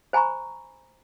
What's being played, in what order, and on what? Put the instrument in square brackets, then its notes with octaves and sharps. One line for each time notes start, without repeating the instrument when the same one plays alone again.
[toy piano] C5 G#5 A#5 B5 C#6